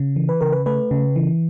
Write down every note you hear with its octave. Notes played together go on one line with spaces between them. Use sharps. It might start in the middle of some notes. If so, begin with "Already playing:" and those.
Already playing: C#3
E3
B4
C#3 A#4
B4
A3 B4
C#3
E3